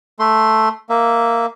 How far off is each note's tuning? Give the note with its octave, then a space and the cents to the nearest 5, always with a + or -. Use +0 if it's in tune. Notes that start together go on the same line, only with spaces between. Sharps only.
A3 +0 C6 +0
A#3 -5 E5 +0